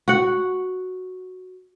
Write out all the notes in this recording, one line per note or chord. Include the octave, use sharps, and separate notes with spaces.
F#4 F#5